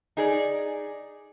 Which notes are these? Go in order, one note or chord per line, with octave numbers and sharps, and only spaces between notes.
D#4 G#4 D5